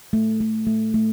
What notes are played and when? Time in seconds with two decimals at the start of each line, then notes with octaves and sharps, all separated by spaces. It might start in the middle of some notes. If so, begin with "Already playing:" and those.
0.13 A3
0.41 A3
0.67 A3
0.94 A3